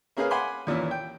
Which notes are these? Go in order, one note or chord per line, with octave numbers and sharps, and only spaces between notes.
A#3 C#4 G#4 A#4 B4 F5
F#5 G#5 B5 C6 D6
D#2 A#2 E3 C#4 E4
G5